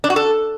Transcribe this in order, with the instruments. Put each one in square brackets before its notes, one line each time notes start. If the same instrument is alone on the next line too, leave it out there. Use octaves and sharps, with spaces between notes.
[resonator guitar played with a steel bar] D4
F#4
A4